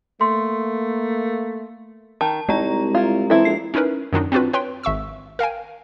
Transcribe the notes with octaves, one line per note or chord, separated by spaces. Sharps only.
A3 A#3 C6
D#3 A5
C2 G#3 D#4 A#5
E4 F4
E3 C4 E4 A4
A#1 C7
C#4 D#4 E4 A#4 B4
F#2 D#3 D4 D#4
C4 D4 F4 F#4 B4
B4 C#5 G5 C6
G#1 E5 C#6 E6
A#4 F5 G5 G#5